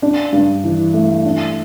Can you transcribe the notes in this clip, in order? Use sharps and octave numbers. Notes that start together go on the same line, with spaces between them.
D4
G2
E3
A3
D4